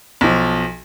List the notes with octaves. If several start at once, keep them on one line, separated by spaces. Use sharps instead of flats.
B1 F3